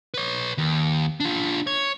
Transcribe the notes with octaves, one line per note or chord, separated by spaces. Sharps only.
B4 C#5
D#2
D4 F4
C#5